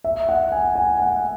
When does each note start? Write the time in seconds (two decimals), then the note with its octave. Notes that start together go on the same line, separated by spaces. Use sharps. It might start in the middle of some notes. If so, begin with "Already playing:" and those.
0.04 E5
0.29 F#5
0.52 G#5
0.76 G#5
0.99 F#5